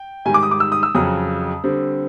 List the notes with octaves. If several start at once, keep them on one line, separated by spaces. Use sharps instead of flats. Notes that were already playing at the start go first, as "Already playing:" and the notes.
Already playing: G5
G#2 D#3 G3 G#5
D6
D#6
D6
E6
D#6
E6
F2 C#3 F#3 D#6
D3 G3 C4